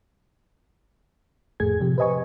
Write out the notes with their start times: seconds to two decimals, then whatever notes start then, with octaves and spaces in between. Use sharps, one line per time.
1.60 F2 A2 A3 G#4 G#6
1.80 C3 F3 G4
1.98 B4 C5 D#5 G#5 C#6